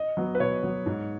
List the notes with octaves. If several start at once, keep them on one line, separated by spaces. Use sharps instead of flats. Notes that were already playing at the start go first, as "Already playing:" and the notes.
Already playing: D#5
F#3 B3
B4
B2 C#5
F#3 B3
G#2